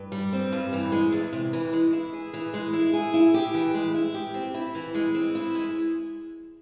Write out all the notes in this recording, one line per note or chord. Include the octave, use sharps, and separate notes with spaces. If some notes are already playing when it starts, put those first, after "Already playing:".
Already playing: G2
G3
C4
G2
E3
G#3
E2
C3
E3
G#3
E4
G#4
E3
G#3
E4
G#4
E4
G4
E3
G#3
E4
G4
C4
E4
E3
G#3
C4
E4
G#3